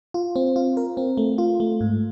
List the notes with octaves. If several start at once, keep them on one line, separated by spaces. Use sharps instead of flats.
F4
C4
F4
A#4
C4
A3
F4
A3
G#2